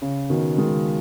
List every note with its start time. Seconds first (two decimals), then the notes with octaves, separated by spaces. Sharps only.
0.02 C#3
0.30 B2 D#3
0.58 D#3 G#3